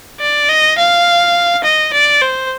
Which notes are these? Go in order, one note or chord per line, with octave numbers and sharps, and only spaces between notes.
D5
D#5
F5
D#5
D5
C5